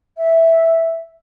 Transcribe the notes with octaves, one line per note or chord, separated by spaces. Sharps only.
E5